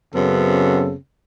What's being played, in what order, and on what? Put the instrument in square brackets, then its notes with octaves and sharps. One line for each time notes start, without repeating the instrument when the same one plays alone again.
[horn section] F#2 C#3 B3 C4 A4